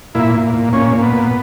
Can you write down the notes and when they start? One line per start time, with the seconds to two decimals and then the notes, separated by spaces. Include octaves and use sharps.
0.15 A#2 E4
0.34 A#2
0.54 A#2
0.73 A#2 C#4
0.92 A#2
1.02 B3
1.12 A#2